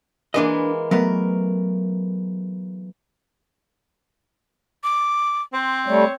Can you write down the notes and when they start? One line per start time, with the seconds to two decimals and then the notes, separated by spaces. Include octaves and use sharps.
0.34 E3 G#3 A#3 D4 B4 D#5
0.91 F#3 A3 B3 A#4
4.84 D6
5.53 C4 C6
5.87 G3 A3 C#5